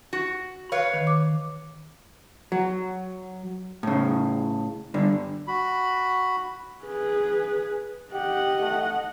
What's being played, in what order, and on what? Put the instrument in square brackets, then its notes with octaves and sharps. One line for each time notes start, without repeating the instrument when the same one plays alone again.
[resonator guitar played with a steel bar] F#4
B4 C#5 F5
[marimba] D#3
D6
[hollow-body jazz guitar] F#3
A2 C#3
G2 D3
[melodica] F#4 B5
[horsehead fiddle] G#4 B4
[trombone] G4 [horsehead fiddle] D#5 F#5
[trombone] A3